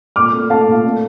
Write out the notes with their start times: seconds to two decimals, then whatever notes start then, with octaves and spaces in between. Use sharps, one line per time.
0.16 A#2 D6 F6
0.33 A3
0.50 A3 F5 A5
0.68 A#2
0.84 A3